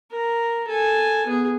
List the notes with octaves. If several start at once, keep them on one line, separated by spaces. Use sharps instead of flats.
A#4
A4 G#5
B3 G#4